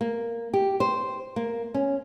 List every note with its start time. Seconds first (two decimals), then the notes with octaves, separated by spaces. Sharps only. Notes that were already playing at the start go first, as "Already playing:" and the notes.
0.01 A#3
0.54 G4
0.80 C5
1.36 A#3
1.74 C#4